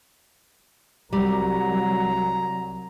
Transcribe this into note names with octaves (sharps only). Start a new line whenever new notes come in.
C2 F#3 G3 A#5